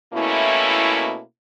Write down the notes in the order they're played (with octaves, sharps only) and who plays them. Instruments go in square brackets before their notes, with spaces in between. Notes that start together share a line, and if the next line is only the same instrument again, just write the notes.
[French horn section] B2 A3 A#3 C#4 E4